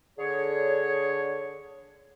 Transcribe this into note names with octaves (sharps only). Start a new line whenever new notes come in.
D3 G#4 C#5